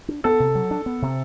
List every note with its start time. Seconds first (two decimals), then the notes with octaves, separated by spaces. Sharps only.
0.08 D4
0.24 B3 A4
0.40 C3
0.55 F#3
0.71 D4
0.86 B3
1.02 C3